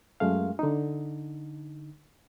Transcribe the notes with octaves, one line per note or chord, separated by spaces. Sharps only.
F#2 G#3 A3 F5
D3 D#4